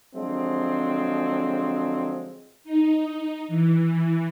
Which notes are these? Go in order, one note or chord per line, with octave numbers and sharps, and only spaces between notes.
D3 F3 F#3 G#3 C4
D#4
E3